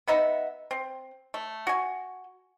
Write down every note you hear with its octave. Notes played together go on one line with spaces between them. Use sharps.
B3 D#4 E5 F#5
C4
A3
F#4 G#5